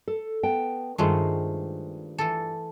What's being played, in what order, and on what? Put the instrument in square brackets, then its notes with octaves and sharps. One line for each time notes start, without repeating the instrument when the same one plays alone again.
[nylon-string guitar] A4
B3 G5 A5
[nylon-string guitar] G2 F4 C5 [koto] D#3 G#3 A3
[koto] E3 A4